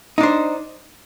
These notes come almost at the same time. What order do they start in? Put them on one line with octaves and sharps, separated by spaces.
D#4 D4 C5